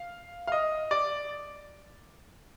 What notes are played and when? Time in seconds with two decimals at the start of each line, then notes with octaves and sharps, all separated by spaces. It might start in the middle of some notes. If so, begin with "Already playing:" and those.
Already playing: F5
0.47 F5
0.52 D#5
0.91 D5